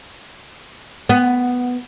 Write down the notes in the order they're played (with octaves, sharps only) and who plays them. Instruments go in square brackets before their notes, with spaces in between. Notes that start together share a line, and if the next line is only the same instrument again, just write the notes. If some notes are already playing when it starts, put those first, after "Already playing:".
[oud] B3